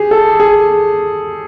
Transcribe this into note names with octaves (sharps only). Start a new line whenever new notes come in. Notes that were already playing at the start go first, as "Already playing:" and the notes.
Already playing: G4 G#4
A4
G#4